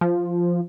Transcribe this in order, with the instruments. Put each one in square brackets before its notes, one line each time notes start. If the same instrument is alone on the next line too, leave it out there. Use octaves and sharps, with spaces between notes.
[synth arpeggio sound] F3